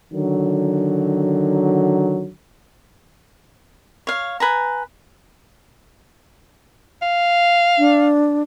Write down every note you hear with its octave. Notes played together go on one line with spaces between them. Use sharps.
D3 D#3 F#3
C#5 F5
B4 G#5 A#5
F5
D4